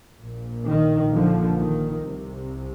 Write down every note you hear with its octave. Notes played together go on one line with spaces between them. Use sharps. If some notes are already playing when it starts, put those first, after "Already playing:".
A#1 A#2
D#3
D3 F3
D#3
C2 C3